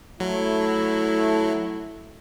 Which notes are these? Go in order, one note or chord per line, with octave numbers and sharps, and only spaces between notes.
F#3 A3 E4